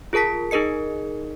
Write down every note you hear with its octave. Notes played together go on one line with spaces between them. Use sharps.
F4 G#4 A#4 A5 B6
D#4 G#4 A#4 D#5 C#7